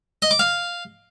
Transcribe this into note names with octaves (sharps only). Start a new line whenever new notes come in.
D#5
D6
F5